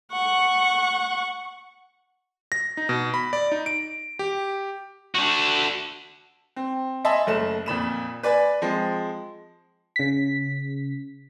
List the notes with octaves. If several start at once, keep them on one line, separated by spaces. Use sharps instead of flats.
F#5 C#6
A#6
D#4
B2
B5
D5
D#4
D7
G4
D4 F#4
C4
D#5 E5 G#5 A5 B5 C6
F#1 A3 E7
F2 A#2 B5 E7
B4 D5 G#5 B5
F3 G#3 C4
C#3 B6